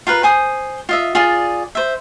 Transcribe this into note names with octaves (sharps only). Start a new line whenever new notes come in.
F4 A#4 B4
C5 G#5 D#6
F4 D#5 E5
F4 G#4 D5
C5 E5